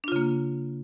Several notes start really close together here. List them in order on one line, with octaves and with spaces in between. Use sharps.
D4 F4 C#3 A#3